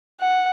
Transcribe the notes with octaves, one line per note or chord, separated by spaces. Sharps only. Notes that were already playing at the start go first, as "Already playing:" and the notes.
F#5